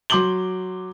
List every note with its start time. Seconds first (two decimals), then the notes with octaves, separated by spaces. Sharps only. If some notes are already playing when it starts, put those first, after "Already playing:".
0.10 F#3 C6 D6 G6 F#7 G7